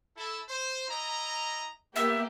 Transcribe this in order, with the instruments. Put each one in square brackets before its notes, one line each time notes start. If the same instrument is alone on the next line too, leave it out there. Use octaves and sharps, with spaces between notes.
[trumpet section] E4 A4
C5
E4 D#5 A#5
[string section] A#3 G4 [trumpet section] B3 [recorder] E5